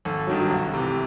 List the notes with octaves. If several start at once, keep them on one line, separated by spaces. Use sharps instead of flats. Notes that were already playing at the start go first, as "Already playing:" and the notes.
G#1 A4
G2 D#3 F#3
C2
C3 E3